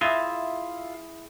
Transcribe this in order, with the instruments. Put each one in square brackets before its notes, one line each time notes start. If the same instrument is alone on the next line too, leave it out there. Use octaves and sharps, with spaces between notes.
[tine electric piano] E4 G#4 [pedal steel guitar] F4 E5